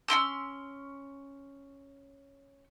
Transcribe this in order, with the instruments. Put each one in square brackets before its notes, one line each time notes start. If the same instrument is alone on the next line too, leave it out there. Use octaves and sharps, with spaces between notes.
[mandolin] C#4 E4 C6 E6